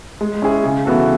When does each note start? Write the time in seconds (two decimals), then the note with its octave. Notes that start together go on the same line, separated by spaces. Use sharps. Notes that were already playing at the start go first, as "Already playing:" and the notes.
0.21 G#3
0.42 C#4 E4 G#4
0.64 C#3
0.85 E3 B3 F#4 A4